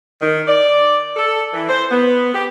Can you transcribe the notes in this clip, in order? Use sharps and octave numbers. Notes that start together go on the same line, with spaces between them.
D#3
D5
A4
E3
C5
B3
G4